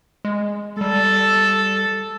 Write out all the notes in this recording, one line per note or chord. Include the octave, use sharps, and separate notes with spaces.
G#3
G3 A4